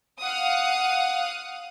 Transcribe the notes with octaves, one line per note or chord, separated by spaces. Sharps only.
F5 F#5 D#6